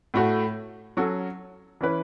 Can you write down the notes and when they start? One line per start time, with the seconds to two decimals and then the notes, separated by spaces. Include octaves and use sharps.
0.14 A2 A3 F#4
0.97 F#3 C#4 F#4 A4
1.81 E3 C#4 E4 B4